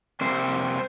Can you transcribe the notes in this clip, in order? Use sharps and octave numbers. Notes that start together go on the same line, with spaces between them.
F2 C3 G3 A#3 C5